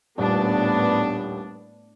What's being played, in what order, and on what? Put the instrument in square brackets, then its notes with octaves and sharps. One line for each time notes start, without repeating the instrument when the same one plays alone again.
[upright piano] D#1 [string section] A2 B3 D4